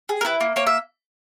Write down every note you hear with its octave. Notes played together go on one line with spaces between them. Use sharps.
G#4
A#4
E4 B4
A#3
A#3 C#5
E5